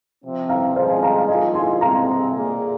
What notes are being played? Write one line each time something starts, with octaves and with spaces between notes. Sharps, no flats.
C3 F3 C4
F5 A#5
F3 G#3 C4 G#4 C5 F5
D#5 G#5
F5 A#5
F5
G#2 F3 A#3 F4 G#4 D#5 G#5
G#5 C6
C3 G#3 C4 F5 A#5
A#2 A#3 G#4